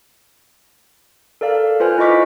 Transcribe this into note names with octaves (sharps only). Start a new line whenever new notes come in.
A4 A#4 D5 F5
F4 B4 C5 G#5 F6
E4 F4 D#5 C#6 D6 B6